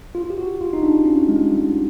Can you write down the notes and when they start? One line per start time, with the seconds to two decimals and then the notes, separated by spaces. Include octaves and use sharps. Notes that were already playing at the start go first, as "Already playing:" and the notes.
0.15 F4
0.30 G4
0.38 F#4
0.61 F4
0.73 D#4
0.83 D4
1.06 C#4
1.29 G#3
1.52 G3